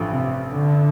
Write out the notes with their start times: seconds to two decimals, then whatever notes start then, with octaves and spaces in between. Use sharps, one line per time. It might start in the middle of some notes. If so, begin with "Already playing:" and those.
Already playing: A1 G2 F3 A3
0.12 C3
0.51 D3